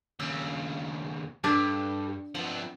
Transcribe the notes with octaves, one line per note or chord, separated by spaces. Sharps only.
D#2 C#3 E6
G2 D4 G4 A4 B4
F3 B3 C4